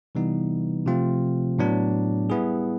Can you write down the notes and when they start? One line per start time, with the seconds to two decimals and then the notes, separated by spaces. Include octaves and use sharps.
0.15 C3 E3 G3 B3 D#4
0.86 C3 F3 A3 C4 F4
1.59 A2 F#3 B3 D4
2.30 G3 B3 E4 G#4